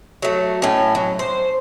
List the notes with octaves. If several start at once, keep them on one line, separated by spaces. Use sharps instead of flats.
F#3 A3
A2 C#4
F#3
C5